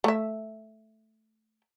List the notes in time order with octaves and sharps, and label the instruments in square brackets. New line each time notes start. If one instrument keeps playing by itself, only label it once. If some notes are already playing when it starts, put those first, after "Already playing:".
[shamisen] A3 E5